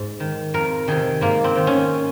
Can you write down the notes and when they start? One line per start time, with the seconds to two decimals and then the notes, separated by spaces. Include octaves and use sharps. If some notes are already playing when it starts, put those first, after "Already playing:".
Already playing: G#2
0.20 D#3
0.54 F2 A#4
0.88 C3 D#3 G#4
1.21 G#2 A#3
1.44 C4
1.56 D#3
1.67 C#4